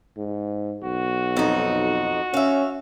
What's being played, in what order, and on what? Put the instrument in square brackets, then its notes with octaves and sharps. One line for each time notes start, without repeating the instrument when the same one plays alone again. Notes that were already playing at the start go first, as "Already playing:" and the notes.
[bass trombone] G#2
[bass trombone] B1 [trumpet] F#4
[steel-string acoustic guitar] F2 D#4
[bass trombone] C#4 [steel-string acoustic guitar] E5 F5